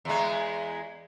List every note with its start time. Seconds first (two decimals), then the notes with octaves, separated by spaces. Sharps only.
0.05 E2 G#3